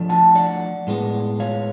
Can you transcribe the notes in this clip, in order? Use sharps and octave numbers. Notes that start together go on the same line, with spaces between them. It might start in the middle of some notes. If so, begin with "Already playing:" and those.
Already playing: F3 A3 D4
F#5 A5
D5 F#5
A2 G#3 B3
C#5 F5